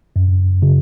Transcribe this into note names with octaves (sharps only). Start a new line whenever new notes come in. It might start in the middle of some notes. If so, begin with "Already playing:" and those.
F#2
C#3